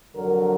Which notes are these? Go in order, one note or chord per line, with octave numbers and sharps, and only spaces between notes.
F2 D3 F#3 A#4